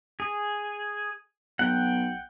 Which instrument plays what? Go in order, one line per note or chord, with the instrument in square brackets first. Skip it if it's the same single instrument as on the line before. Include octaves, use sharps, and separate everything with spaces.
[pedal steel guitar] G#4
[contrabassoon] B1 [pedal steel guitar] F#5 G5